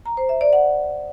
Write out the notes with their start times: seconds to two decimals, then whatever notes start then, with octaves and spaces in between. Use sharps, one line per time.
0.06 A#5
0.17 C5
0.29 E5
0.41 D5
0.53 F#5